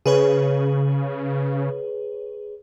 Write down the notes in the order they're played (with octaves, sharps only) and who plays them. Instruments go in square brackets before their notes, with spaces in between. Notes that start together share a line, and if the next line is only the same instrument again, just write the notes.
[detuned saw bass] C#3 [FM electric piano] G#4 B4 C#5